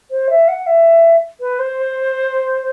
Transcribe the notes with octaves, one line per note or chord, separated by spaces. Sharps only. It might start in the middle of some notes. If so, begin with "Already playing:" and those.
C5
E5
F#5
E5
B4
C5